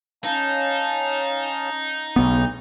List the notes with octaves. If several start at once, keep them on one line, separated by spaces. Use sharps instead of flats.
C#4 D#4 F5 A5
B1 C#3 B3